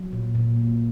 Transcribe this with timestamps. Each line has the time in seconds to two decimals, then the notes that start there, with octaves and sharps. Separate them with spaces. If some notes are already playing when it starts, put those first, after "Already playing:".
Already playing: F#3
0.13 A#2
0.35 A#2
0.57 A#3